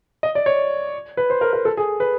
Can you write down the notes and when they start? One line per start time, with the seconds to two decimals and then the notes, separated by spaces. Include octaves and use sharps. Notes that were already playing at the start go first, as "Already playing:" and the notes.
0.23 D#5
0.35 D5
0.46 C#5
1.17 B4
1.30 C5
1.41 A#4
1.53 A#4
1.65 A4
1.77 G#4
2.00 B4